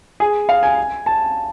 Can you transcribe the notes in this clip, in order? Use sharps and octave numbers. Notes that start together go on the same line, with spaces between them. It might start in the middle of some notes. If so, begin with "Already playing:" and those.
G#4
F5
G#5
A5